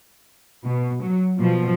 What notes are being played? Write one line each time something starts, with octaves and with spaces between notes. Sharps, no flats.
B2
F#3
B2 F3